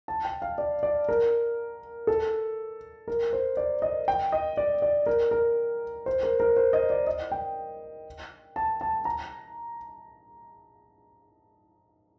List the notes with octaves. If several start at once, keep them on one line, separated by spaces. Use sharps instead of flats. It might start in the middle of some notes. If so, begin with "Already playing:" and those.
A5
G5
F5
D5
D5
A#4
A4
A#4
C5
D5
D#5
G5
D#5
D5
D5
A#4
A#4
C5
A#4
A#4
C5
D#5
D5
D#5
G5
A5
A5
A#5